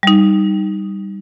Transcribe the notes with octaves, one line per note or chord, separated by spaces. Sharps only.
G3 D#4